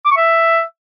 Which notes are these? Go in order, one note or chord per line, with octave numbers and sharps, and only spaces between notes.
D6
C#6
E5